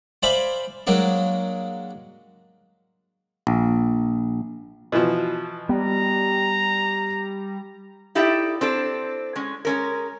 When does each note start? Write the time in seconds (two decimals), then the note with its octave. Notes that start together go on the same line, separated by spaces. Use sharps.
0.23 C5 D5 E5 F5 G#5 B5
0.87 F#3 G#3 A#3 D4
3.47 A#1
4.92 B2 E3 F3
5.69 G3 B3 A#5
8.15 D#4 E4 G4 A4 D5 E5
8.61 C4 D4 A4
9.36 G#3 C#4
9.65 G#3 C#4 A#4